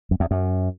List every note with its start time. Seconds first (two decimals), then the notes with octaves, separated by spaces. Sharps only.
0.11 F#2
0.20 E2
0.31 F#2